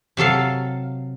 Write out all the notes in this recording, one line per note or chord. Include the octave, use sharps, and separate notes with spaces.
C3 F#3 A4 F5